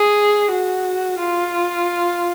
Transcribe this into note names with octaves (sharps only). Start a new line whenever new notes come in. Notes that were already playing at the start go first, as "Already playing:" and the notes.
Already playing: G#4
F#4
F4